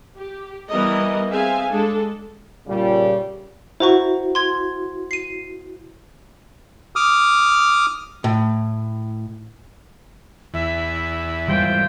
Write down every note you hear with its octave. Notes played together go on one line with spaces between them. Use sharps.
G4
E3 G3 B3 E4 A#4 D#5
C4 G#4 E5 F5 G#5
G#3 D4 A4
A#2 C#3 G3
E4 F#4 C5 A#5 C#6
C6 G#6
C7 D#7
D6 D#6 F6
A2
E2 E5
G#2 E3 G3 F4 C5 G5